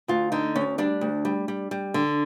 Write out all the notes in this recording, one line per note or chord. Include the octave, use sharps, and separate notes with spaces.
D2 F4
D3 D#4
D2 C#4
G3 D4
D2
G3
G3
G3
D3